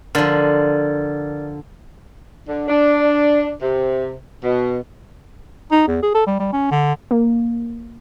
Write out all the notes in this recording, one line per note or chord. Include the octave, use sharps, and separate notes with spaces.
D3 F3 A#4 D5
D3
D4
C3
B2
D#4
E2
G#4
A4
G3
G3
C#4
D3
A#3